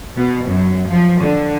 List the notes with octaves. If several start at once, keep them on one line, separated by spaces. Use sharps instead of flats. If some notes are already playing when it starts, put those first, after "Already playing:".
B2
F#2
F3
D3